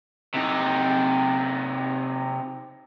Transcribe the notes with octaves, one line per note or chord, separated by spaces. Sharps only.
C3 D#4